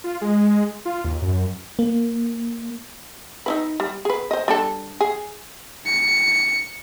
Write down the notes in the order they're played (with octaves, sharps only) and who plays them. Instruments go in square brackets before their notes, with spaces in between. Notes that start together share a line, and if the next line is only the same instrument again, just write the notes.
[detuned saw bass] F4
G#3
F4
D#2
F#2
[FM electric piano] A#3
[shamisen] D#4 E4 B4
G3
G#4 B4
C5 D#5
G3 D4 A4
G#4
[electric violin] C#7